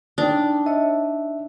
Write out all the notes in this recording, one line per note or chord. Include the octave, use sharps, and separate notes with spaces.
D4 D#4 G5
C#5 D#5 E5